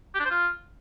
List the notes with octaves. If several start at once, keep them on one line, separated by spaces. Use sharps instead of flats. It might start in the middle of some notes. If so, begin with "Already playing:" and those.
G4
D4
C5
F4